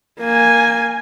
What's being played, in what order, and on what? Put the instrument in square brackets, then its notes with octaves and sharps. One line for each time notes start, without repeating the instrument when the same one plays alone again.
[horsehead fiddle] A#3 G#5